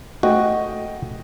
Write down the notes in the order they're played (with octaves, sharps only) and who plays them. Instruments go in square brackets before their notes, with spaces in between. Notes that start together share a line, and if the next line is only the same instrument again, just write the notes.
[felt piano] A3 D#5 G5 [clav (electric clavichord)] F#4